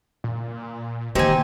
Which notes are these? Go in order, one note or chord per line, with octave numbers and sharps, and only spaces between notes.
A#2
D#3 A#3 C4 D#4 G4 G#5